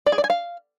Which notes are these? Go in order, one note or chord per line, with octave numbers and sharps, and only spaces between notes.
D5
G#4
D5
G#5
F5